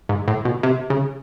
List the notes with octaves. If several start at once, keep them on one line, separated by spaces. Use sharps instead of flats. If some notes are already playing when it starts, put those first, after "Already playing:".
G#2
A2
B2
C3
C#3